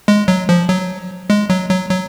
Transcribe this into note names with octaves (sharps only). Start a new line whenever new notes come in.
G#3
F#3
F3
F#3
G#3
F#3
F#3
F#3